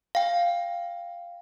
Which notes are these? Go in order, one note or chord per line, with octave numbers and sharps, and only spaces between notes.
F5 G5